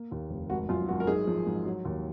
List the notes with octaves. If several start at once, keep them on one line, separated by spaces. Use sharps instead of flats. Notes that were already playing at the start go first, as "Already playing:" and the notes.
Already playing: A#3
D#2
F1
G#1 F#4
F#2 F4
G#1 F#4
A#4
D#4 G#4
F3
G#2
F#3
D#2